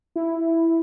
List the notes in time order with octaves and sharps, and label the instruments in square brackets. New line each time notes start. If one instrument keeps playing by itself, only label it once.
[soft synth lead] E4